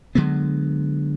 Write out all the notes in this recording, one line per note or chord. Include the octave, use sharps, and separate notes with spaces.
D3 F#3 G#3 B3